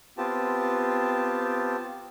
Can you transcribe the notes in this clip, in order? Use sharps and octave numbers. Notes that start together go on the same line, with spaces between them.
B3 C4 F4 G4 A5